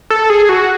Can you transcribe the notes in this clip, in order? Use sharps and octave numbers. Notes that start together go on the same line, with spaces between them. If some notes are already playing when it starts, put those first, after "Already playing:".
A4
G#4
F#4